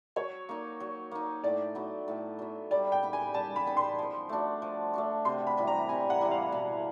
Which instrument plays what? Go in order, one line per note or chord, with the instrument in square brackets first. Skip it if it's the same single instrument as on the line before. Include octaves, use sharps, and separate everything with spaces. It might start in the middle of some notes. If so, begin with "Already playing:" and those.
[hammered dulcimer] F#3 [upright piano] C#5
[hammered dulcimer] A#3 D#4
F#3
A#3 D#4
[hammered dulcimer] A2 [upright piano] D5
[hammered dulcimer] F#3 B3
A2
F#3 B3
[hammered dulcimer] G3 [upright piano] D5
[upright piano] G5
[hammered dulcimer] B3 D#4
[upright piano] G#5
[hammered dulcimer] G3 [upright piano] A5
[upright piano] B5
[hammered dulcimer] B3 D#4
[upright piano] C6
[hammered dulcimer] F3
A3 D4 F#4
F3
A3 D4 F#4
[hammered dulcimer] C3 [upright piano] C6
[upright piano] B5
[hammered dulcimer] E3 G3 C4
[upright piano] A#5
[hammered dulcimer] C3 [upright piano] G#5
[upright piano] F#5
[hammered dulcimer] E3 G3 C4
[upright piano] F5
[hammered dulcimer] B2